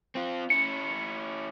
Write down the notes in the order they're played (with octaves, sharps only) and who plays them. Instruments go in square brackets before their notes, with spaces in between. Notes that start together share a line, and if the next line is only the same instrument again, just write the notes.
[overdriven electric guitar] C4 F4
[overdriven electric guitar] C#4 E4 [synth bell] C#7